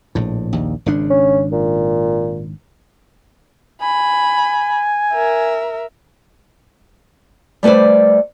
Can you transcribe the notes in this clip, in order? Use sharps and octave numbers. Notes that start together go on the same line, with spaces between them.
A#1 A2
A#1 D#2
G#1 C#3 D4
C#4
A#2
G#5 B5
A#4 E5
G3 A3 B4 C5 D5